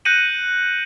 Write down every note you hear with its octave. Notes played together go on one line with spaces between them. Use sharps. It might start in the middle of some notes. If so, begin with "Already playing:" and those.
F#6 G6 A#6 C#7 D#7 F#7